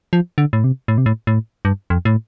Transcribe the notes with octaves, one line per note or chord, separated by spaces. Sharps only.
F3
D3
A2
C3
A2
C3
A2
A2
G2
F2
A2